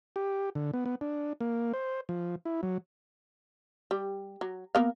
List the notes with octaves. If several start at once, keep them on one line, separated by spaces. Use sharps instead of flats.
G4
D3
B3
B3
D4
A#3
C5
F3
E4
F#3
G3
F#3
A#3 B3 F5